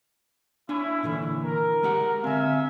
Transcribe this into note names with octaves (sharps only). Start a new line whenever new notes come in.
C#4 D4 E4 G#5
A#2 D3 E3
A#4
G#3 G4 F#5
D3 C4 E5 F5 G#5